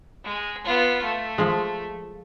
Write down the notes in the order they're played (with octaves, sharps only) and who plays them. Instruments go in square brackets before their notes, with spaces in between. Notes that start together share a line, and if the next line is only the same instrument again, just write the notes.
[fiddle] G#3
B3 F4
A3
[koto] F3 G#3